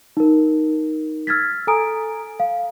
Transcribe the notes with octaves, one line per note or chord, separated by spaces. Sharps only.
D#4 A#4
E6 F6 G#6 A6 B6
A4 G#5 A#5 D#6 D7
F5